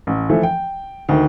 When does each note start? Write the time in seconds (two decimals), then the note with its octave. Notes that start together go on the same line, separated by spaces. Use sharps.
0.07 A1
0.29 E3 F3 A3
0.43 G5
1.09 D2 D#3